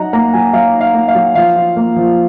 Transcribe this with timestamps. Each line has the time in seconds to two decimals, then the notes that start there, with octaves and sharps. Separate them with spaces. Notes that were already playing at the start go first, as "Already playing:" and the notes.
Already playing: F#3 D#4 F#5 A#5
0.13 A#3 A#5
0.33 F#3 G#5
0.53 F#3 F5
0.74 D#4
0.81 F5
0.95 A#3
1.08 F5
1.15 F#3
1.35 F3 F5
1.56 F4
1.76 A#3
1.96 F3